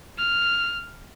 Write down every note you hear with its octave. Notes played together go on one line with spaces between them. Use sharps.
F6